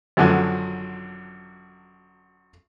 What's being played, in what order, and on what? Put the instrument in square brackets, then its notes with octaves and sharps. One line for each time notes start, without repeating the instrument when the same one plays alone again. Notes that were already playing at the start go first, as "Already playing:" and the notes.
[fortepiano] G#1 F#2 D3 F3 F#3